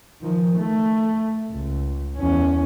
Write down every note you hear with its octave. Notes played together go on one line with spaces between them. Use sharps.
D#3 F3
A3
C#2
E2 C#4